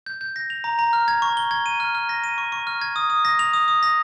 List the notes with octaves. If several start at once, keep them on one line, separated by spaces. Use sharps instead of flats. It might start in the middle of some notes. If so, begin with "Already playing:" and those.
G6
G6
A#6
F7
A#5
A#5
F6
G#6
C#6
G7
G#6
D#7
F6
F6
A#6
D#7
C#6
C#6
F6
G#6
D#6
D#6
A#6
F7
D#6
D#6
A#6